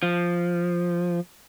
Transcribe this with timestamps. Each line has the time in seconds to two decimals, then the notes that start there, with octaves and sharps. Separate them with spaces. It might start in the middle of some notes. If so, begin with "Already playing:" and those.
0.03 F3